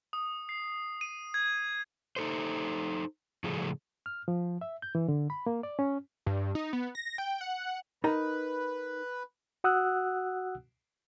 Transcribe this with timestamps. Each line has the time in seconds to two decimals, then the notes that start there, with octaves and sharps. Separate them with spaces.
0.13 D#6
0.49 C7
1.01 D#7
1.34 G#6
2.16 D#4 A4 C5
3.44 A2 C#3 F3 G#4 A4
4.06 F6
4.28 F3
4.61 E5
4.82 G6
4.95 E3
5.08 D3
5.30 B5
5.46 A#3
5.63 D5
5.79 C#4
6.26 G2
6.55 D#4
6.73 B3
6.95 A#6
7.18 G5
7.41 F#5
8.04 D#4 A#4 B4 A#5
9.64 F#4 F#5 D#6 E6 F#6